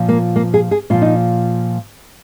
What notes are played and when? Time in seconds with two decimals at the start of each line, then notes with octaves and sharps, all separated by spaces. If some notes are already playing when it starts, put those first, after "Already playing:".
Already playing: A#2 F3
0.08 A#3
0.36 A#3
0.54 G#4
0.71 G#4
0.90 A#2 F3 F4
1.02 D#4